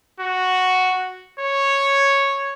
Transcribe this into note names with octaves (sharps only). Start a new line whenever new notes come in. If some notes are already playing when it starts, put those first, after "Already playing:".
F#4
C#5